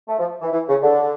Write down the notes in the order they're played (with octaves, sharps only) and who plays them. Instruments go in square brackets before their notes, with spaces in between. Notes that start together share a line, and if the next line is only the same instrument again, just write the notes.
[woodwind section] A3
F3
E3
E3
C#3
D3